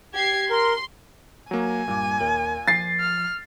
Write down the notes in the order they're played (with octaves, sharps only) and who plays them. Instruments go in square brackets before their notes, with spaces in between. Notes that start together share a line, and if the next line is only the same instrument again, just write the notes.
[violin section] G4 G#6 C7
[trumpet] A#4 [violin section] C6
[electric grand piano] F#3 A#3 [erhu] G#5
[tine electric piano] G2 G3 D6 [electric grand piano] A#2
[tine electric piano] D#2 A#4
[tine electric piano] F3 [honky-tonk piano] A6 C7
[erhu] F6